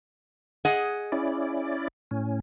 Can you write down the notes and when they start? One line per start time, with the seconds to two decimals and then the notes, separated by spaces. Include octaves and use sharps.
0.65 G#4 D#5 F#5
1.12 C#4 E4 D5
2.11 A2 C#4